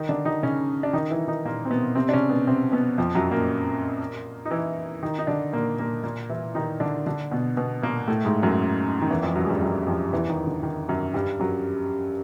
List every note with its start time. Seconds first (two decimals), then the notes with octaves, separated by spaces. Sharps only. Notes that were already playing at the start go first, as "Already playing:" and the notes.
Already playing: D#3 D#4
0.09 D3 D4
0.25 D#3 D#4
0.43 C#3 C#4
0.83 D4
0.93 D#3 D#4
1.10 E3 E4
1.27 D#3 D#4
1.45 A#2 A#3
1.65 C4
1.70 B2 B3
1.95 C3 C4
2.09 D4
2.13 C#3 C#4
2.29 B2 B3
2.47 C3 C4
2.72 B2 B3
2.98 F2 F3
3.15 F#2 F#3
3.31 A#2 A#3
4.46 D#4
4.51 E3 E4
5.03 D#3 D#4
5.19 D#4
5.27 D3 D4
5.52 A#2 A#3
5.79 A#2 A#3
6.04 A#2 A#3
6.29 E3 E4
6.55 D#3 D#4
6.80 D3 D4
7.06 D3 D4
7.31 B2 B3
7.57 B2 B3
7.82 A#2 A#3
8.08 A2 A3
8.25 G#2 G#3
8.43 F#2 F#3
9.02 D#3
9.10 E2 E3
9.23 F2 F3
9.35 F#2 F#3
9.45 G#3
9.48 G2 G3
9.61 F#2 F#3
9.87 F2 F3
10.13 E2 E3
10.30 D#3
10.47 D3
10.63 D#3
10.88 F#2 F#3
11.14 G2 G3
11.39 F#2 F#3